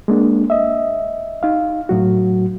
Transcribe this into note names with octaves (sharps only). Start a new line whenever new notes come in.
G#3 A#3 D4
D#5 E5
D#4 F5
A2 F#3 F#4